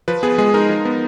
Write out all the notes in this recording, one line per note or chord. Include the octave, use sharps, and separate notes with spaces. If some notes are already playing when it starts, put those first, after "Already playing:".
F3 B4
B3 G#4
G#3 G#4
D#4 A#4
F3
B3